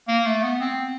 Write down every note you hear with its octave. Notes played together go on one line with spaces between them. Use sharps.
A#3
A3
B3
C4